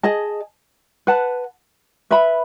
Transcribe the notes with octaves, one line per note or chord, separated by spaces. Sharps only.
G#4 D#5 A5
B4 F#5 A5
B4 E5 B5